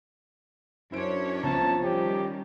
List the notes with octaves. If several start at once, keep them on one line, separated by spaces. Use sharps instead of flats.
F#2 C#4 D4 E4 C5 C#5 D7
C2 F3 B3 A5 A#5
D#3 G3 C#4 G4